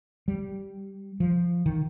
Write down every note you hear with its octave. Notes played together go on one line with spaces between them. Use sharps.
G3
F3
D#3